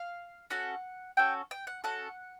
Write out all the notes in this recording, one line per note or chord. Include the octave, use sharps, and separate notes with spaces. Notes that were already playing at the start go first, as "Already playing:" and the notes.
Already playing: F5
C#4 F#4 A4 F#5
C#4 F#4 A4 G5
G5
F#5
C#4 F#4 A4 F#5